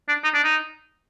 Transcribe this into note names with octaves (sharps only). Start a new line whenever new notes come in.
D4
D#4
D4
D#4